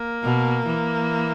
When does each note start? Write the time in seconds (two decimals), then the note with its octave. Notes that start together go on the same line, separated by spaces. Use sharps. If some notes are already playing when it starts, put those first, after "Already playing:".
Already playing: A#3
0.23 B2
0.66 E3